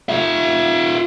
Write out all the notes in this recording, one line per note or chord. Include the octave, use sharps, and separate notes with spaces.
F4 E5